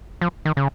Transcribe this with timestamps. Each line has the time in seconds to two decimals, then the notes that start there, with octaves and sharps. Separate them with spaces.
0.21 F3
0.45 D#3
0.57 C#3